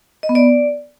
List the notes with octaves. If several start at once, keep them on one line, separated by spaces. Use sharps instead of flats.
D#5
B3
D5